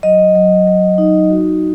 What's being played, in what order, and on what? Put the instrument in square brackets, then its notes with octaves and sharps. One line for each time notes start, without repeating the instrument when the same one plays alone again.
[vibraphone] F#3 D#5
F#3
F#3
D#4
F#4